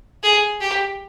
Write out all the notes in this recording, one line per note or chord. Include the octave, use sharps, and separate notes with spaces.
G#4
G4